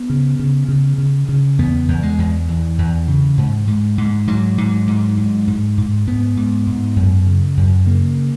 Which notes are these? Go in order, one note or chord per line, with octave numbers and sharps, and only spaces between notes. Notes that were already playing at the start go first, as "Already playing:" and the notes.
Already playing: B3
C#3
C#3
C#3
C#3
C#3
E2 B3
E2
G#3
E2
E2 E3
E2
C#3
G#2
G#2
G#2
G#2 F#3
G#2
G#2
G#2
G#2
G#2
G#2 B3
G#2
G#2
F#2
C#3
F#2
C#3 A#3